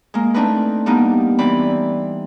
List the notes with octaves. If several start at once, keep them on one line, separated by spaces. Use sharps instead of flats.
G#3 A#3
A3 C4 D4 D#4 B4
G3 A#3 B3 D4 D#4
E3 C4 D5 B5